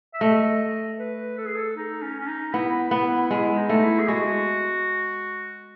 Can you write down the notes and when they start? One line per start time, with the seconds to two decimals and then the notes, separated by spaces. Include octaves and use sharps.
0.14 E5
0.21 A3 D#5
0.99 B4
1.37 A4
1.46 G#4
1.55 A4
1.76 D#4
2.02 C#4
2.20 C#4
2.27 D#4
2.53 B3 E4
2.91 B3
3.31 G#3 E4
3.57 D#4
3.69 A3
3.78 D#4
3.83 E4
3.99 G#4
4.08 G#3 F#4